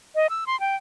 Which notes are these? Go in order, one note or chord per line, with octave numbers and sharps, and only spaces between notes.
D#5
E6
C6
G5